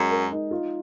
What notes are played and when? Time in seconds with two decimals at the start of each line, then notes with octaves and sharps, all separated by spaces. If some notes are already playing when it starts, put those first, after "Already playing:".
Already playing: F#2 G#3 G#4
0.11 A#4
0.31 D#4
0.51 F4